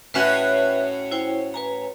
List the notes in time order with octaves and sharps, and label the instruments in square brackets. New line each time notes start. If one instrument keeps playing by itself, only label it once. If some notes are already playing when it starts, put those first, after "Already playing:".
[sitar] A2 C#4 F#4 [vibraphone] B4 E5
[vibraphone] E4 C5 G5
B4 G#5 A#5